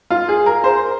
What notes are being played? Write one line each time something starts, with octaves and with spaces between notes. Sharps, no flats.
F4
G#4
A#4
C5